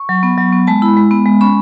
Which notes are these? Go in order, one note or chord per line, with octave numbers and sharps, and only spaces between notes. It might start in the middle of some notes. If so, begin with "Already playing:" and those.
Already playing: C#6
F#3
B3
F#3
B3
G#3 A5
E4 B5
G#3
B3
G#3
C#4 B5